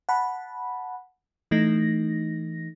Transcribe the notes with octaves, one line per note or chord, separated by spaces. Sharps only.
F#5 A5 B5
E3 A3 D#4 A#6